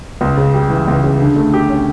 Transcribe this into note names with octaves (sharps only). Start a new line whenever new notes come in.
C#2
C#3
G3
E3
C#2
C#3
D3
A3
G4
C#4